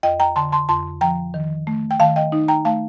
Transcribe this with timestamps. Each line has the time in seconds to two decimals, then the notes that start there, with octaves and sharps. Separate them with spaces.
0.03 F2 D#5 G5
0.20 G5 A#5
0.36 D3 A5 C6
0.52 A5 C6
0.69 F2 A5 C6
1.01 F3 G5 A#5
1.34 D#3
1.67 A3
1.91 G5
2.00 D#3 F5 A5
2.16 D#5 G5
2.32 D#4
2.48 G5 A#5
2.65 A3 F5 A5